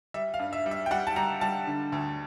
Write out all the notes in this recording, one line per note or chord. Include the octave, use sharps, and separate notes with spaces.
G3 E5
F5
G2
E5
G3
E5
G5
G3 F#5
A5
G3 A#5
G3 A5
D3
D2